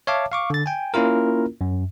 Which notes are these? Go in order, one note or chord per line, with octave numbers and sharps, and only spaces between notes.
C#5 E5 F5 A5 D6
F5 C#6 D6
D3 A6
G5 G#5
A#3 C#4 E4 F4 A#4
F#2